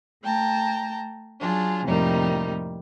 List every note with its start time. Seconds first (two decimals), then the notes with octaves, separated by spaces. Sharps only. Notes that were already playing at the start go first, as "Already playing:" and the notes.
0.23 A3 G5 A5 A#5
1.40 F#3 D4 F4 G#4
1.85 F2 A2 C3 G3 A#3 D#4